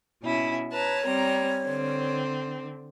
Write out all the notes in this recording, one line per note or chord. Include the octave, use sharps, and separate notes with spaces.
B2 C#4 E4
B4 C#5 A5 A#5
G3 C4 A#5
D3 C4